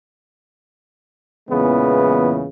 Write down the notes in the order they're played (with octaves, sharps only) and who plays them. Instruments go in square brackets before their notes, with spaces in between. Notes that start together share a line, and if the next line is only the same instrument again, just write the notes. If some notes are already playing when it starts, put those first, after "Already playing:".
[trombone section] E2 A#2 C#3 E3 G#3 B3